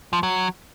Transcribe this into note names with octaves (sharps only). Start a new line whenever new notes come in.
F3
F#3